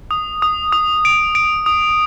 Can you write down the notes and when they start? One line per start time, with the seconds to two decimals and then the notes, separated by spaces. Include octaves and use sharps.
0.11 D#6
0.42 D#6
0.72 D#6
1.05 D7
1.35 D7
1.66 D#6